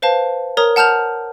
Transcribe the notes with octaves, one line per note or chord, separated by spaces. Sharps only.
B4 C5 F5 A5
A#4 C#5 A#5 D#6
F#5 A5 F6 G6 F7